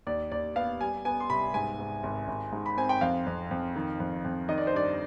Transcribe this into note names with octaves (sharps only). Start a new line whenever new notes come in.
D#2 D5
D#2 D5
B3 F5
G3 G#5
B3 G#5
C6
C2 B5
G#2 G#5
G#2
G#1
G#1
G#2
B5
C4 G#5
G5
F2 F5
F2
F2
D#3
F2
F2
D#3 D#5
D5
C5
G2 D5